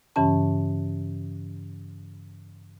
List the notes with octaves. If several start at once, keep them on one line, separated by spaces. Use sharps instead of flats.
G2 C#3 E3 C#4 A5